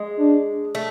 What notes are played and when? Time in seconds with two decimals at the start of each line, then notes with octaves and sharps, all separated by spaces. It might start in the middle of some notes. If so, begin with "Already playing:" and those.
Already playing: G#3
0.19 D4
0.75 A3